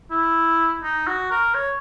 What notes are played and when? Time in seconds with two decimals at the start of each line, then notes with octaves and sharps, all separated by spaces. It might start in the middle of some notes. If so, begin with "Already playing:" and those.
0.11 E4
0.83 D#4
1.07 F#4
1.31 A#4
1.54 C#5